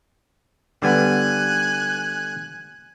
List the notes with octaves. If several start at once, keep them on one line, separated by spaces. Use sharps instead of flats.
D3 G3 B3 G#5 F#6